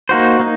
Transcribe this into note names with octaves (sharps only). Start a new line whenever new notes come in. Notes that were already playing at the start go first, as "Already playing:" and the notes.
A#3 D#4 F#4 C5
A#3 D#4